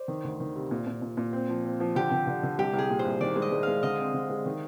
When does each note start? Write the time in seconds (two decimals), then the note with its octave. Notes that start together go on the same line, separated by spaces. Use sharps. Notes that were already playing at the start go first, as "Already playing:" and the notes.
Already playing: C5 D5
0.08 D#3
0.24 D2
0.40 D#3
0.56 C3
0.71 A#2
0.87 A#2
1.02 A#2
1.17 A#2
1.33 C4
1.49 F3
1.65 C4
1.80 F3
1.95 D3 G4
2.12 D3
2.27 D3
2.43 D3
2.58 C2 G4
2.74 C2 G#4
2.90 A#2
2.99 C5
3.05 C2
3.21 D#3 D5
3.36 G#3
3.42 D#5
3.52 G#3
3.63 G#3 F5
3.83 D3 D#5
3.99 C4
4.14 D3
4.30 G#3
4.46 D#3